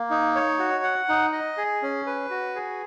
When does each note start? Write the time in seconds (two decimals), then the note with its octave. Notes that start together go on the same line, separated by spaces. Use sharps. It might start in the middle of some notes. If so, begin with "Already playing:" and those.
Already playing: A#3
0.10 D#4
0.35 C#5
0.59 F#4
0.84 F#5
1.09 D#4
1.32 D#5
1.57 G#4
1.82 C#4
2.06 B4
2.30 F#4
2.56 G#4